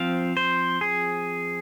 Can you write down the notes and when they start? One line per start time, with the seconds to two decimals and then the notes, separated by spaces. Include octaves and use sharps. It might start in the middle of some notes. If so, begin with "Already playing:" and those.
Already playing: F3 C4 F5
0.37 C5
0.81 G#4